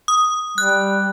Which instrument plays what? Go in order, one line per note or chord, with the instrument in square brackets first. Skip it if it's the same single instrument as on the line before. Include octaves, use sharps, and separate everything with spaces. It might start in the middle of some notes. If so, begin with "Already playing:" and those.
[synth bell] D#6
[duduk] G3 [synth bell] F#6